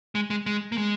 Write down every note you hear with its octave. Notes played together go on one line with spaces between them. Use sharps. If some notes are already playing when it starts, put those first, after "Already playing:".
G#3
G#3
G#3
A#3
G#3